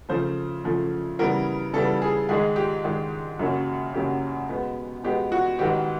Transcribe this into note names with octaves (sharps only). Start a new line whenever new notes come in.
C#3 F3 A3 C5
C#3 F3 A3
C#3 E3 G3 B3 A#4
C#3 E3 G3 B3 A4
G#4
G#2 D#3 G#3 G#4
G4
G#2 D#3 G#3
F#2 C#3 F#3 A#3 C#4
F#2 C#3 F#3 A#3 C#4 G4
B2 G#3 B3
B2 G#3 B3 G4
F#4
G#2 D#3 F#3 B3 G4